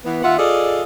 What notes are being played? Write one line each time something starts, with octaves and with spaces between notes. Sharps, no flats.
E3 B3
D#2 F4 E5 F#5
F4 G#4 A4 D5 D#5